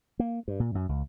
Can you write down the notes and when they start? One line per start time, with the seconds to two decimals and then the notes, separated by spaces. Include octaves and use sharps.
0.19 A#3
0.48 G2
0.60 A#2
0.75 F#2
0.89 C#2